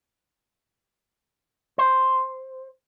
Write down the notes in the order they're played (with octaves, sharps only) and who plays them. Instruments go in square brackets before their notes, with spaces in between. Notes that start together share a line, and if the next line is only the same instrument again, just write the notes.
[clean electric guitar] C5